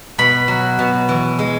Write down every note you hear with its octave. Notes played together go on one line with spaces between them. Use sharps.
B2 B5
F#3
B2
E3
G#3